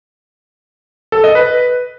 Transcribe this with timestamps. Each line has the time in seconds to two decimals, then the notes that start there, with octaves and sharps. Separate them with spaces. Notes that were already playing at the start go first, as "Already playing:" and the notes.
1.12 A4
1.24 D#5
1.35 B4